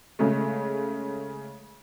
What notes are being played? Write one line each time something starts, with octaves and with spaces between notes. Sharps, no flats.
C#3 G#3 A3